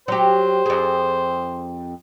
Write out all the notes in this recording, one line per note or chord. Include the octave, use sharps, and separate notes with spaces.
F#3 G4 C5
F2 G#4